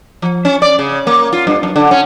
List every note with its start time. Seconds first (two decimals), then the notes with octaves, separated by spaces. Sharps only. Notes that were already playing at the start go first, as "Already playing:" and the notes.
0.22 F3
0.45 C#4
0.62 D5
0.79 C#3
1.07 A#3
1.33 F4
1.47 G2
1.63 F#2
1.76 D3
1.91 C#4